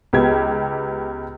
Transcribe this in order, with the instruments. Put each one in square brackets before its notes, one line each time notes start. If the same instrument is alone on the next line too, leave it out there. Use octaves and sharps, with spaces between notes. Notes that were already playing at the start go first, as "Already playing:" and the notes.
[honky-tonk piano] C#2 B3 G4 G#6